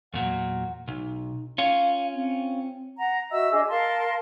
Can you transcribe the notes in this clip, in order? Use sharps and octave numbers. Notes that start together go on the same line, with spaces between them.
E2 A#2 F#3 F#5
B1 D#4
C#4 F4 F5
C4
F#5 A#5
F#4 D#5 E5 E6
D4 G#4 D#5
A#4 F5 A5 C6